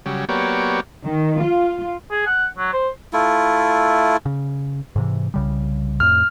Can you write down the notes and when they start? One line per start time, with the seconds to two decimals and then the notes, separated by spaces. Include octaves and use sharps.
0.06 C#3 F#3 G3
0.29 F#3 A#3 B3 G4 C#5 D5
1.04 D#3
1.41 F4
2.11 G#4
2.27 F#5
2.58 F#3
2.73 C5
3.13 A3 E4 F4
4.26 C#3
4.96 G#2 C3 E3
5.34 C2 C#3 G3
6.00 F2 A2 F6